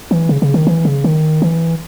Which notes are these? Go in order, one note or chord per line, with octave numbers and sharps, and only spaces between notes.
E3
C#3
C#3
D#3
E3
C#3
D#3
E3